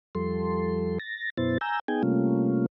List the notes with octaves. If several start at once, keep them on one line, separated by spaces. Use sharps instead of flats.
F2 F3 G3 A4 C6
A6 A#6
F#2 B2 B3 E4 C5 A6
G#5 A#5 E6 G6
B3 D#4 G#4 G5 G#5
C3 G3 A3 A#3 C#4 F4